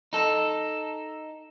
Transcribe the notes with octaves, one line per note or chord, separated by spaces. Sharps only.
D#4 A4